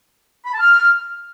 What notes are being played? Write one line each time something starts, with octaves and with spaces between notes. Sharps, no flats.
B5
A5
F6